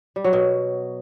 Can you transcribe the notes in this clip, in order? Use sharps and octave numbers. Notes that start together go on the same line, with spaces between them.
G3
F#3
B2